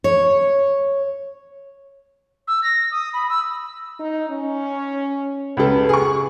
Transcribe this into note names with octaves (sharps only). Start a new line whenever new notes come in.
C#5
E6
A#6
D#6
B5
E6
D#4
C#4
C#2 C#3 A4 B4
G#4 C#6